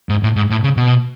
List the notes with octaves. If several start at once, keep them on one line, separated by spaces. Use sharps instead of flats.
G#2
A2
G#2
A2
C#3
B2